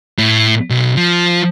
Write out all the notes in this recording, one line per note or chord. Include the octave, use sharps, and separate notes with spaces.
A2
B1
F3